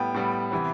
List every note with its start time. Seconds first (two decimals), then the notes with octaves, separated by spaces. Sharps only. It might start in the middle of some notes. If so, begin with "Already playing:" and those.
Already playing: A2 G3 B3 G5
0.14 A2 G3 B3
0.52 C3 E3 B3